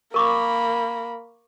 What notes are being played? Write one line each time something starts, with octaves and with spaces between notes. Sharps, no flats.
A#3 A#4 B5 C#6 D6